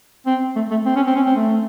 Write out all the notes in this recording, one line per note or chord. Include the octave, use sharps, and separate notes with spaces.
C4
A3
A3
C4
C#4
C4
C#4
C4
A3